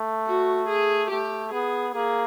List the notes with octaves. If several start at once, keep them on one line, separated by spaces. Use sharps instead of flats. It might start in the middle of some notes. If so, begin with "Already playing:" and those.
Already playing: A3
F#4
G#4
A3 G4
B3 G#4
A#3 G#4